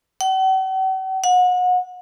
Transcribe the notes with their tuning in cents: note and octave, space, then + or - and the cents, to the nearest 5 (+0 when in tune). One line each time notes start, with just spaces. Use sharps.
F#5 +45
F#5 -30